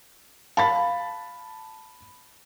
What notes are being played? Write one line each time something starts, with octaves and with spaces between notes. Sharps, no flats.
F5 A5 B5 A6